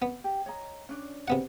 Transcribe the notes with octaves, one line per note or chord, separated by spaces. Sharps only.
B3
G4
C#5 D#5 A#5
C#4 D4 D5
C3 B3 F#5